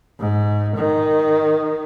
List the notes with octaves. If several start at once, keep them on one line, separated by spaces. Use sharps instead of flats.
G#2
D#3